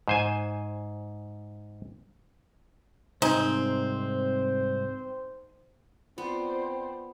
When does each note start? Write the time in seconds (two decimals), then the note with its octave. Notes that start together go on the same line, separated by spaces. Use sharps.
0.08 G#2 C5 G#5
3.22 C2 G#2 C4 D#4 C5 G#5
6.18 B3 C4 F4 C5 D5